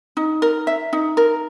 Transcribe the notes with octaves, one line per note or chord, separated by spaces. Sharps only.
D#4
A#4
E5
D#4
A#4